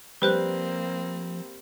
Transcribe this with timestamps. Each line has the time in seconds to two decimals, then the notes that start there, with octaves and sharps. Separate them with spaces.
0.22 F3 G3 A#3 C4 B4 C5 F#6